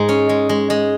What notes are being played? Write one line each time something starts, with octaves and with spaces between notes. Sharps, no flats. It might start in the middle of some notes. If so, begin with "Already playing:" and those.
Already playing: G#2 G#3
C#4
G#3
G#3
G#3